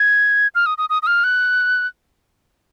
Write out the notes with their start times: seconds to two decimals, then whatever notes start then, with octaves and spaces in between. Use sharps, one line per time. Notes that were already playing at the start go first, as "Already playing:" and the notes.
Already playing: G#6
0.55 F6
0.66 D#6
0.78 D#6
0.89 D#6
1.02 D#6
1.07 F6
1.24 F#6